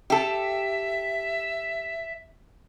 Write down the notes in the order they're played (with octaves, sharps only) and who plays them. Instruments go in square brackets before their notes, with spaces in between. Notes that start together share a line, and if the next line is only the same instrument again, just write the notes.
[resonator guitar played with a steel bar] G4 A4 [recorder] E5